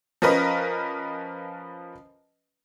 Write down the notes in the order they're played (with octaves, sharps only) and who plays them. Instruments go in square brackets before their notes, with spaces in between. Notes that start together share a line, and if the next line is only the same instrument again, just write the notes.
[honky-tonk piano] F3 C#4 A#4 B4 D#5